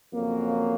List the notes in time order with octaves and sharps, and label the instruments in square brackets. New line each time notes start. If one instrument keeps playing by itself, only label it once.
[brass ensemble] F2 C#3 F#3 A#3